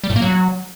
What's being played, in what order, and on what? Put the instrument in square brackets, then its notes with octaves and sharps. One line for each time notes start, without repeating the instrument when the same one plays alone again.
[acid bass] G3
A2
A#3
F#3